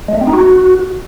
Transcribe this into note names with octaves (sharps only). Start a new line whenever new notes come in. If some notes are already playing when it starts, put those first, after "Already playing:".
G#3
A3
C4
D#4
F#4